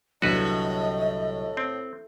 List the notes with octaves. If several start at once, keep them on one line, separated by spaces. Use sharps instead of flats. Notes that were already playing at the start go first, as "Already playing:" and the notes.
C2 A2 D3 F#3 F#4 B4 D#5
C4